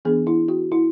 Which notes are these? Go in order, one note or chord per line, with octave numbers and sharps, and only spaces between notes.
E3 B3 D4 G#4
E4
F#4
E4